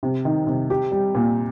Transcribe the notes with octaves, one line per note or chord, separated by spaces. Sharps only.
C3
D#3
C3
G4
G3
A#2